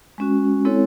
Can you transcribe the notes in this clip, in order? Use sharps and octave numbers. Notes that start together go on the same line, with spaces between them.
G#3 C#4 F#4
G#3 C4 E4 A4 C#5